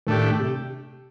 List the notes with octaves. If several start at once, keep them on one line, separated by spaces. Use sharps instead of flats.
A2 D#3 A3 D4 G4
C3